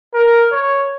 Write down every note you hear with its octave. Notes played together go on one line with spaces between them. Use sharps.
A#4
C#5